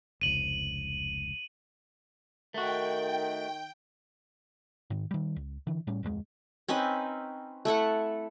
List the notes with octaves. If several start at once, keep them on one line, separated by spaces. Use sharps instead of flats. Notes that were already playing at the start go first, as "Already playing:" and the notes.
F1 C#2 D#7 F#7
D#3 A3 F#4 G5
G#2 D#3
D#3 G3
C#2
D3 E3
A2 G3 C#4
D1 F2 E3 G#3
C4 C#4 D#4 B4
A3 E4 A4 F#5